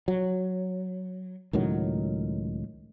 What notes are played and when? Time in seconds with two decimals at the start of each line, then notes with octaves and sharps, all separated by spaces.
0.08 F#3
1.53 C#2 A2 D#3 F#3